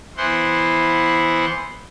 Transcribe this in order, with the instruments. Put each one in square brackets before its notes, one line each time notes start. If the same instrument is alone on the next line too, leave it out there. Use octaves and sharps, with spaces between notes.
[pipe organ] E3 B3 E4 C5 F#5 C6